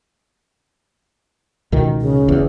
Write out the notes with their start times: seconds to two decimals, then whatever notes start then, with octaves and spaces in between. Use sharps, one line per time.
1.72 C#2 B2 D#3
2.01 C#3
2.28 F#1 E2